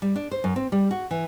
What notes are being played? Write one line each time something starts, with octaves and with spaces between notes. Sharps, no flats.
G3
D4
C5
F#2
C4
G3
F#4
E3